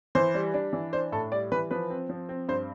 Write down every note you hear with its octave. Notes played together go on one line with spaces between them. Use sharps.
E3 C5
G3
D4
E3
D4 C5
A2 A4
G3 D5
E3 B4
F3 B4
C4
F3
C4
G2 C5